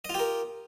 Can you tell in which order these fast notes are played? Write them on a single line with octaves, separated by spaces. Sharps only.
D#5 F4 G4 A#4